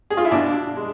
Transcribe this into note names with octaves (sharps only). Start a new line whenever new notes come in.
G#4
F4
E4
B2 D4
G#3